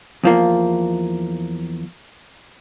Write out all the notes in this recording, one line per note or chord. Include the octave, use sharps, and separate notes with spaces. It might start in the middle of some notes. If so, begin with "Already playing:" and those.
E2 F3 A#3